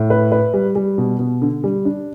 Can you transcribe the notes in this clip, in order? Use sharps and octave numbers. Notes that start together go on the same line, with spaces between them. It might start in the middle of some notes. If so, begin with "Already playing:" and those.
Already playing: A2
B4
B4
G3
G3
B2
B2
D3
G3
D4